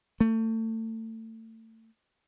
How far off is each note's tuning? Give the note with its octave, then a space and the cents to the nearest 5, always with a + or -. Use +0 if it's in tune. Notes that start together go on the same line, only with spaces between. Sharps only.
A3 +30